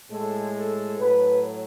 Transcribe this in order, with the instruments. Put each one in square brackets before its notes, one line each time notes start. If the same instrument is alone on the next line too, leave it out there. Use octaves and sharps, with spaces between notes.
[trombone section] A2 G#3 A4
A4
A2 F#3 B4